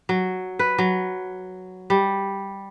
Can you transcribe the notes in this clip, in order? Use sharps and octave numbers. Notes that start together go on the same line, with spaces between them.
F#3
B4
F#3
G3